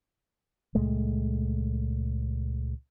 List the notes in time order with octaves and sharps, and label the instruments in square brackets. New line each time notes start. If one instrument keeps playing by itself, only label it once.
[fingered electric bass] C#2 A#2 G#3 A3